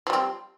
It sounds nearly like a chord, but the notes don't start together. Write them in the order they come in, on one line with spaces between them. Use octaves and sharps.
F3 G3 C4